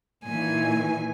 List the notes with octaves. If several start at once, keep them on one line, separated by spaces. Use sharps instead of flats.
A#2 D#3 E3 G#5